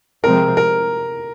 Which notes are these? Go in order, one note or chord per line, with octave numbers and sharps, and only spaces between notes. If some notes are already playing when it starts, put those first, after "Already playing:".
C3 F3 G#3 C4 A#4
A#4